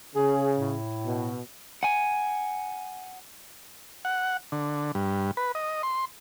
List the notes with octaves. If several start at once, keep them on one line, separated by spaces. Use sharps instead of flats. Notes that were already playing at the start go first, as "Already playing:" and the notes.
C#3 G#4
A2
B2
F#5 G#5
F#5
D3
G2
B4
D#5
C6